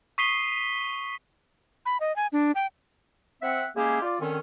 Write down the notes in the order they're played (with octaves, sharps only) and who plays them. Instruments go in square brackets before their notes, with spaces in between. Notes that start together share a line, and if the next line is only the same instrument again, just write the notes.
[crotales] C#6 D#6 B6 C7 D#7 G7
[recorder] B5
D#5
G#5
D4
G5
[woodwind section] C4 E5 F#5
G#3 A#3 C#4 E4 G4 G#4
F4 D5
D3 D#3 C4 C#4